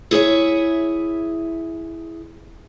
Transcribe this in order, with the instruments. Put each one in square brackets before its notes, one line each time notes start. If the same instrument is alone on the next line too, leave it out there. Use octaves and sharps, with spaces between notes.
[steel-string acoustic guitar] E4 G#4 C#5 E5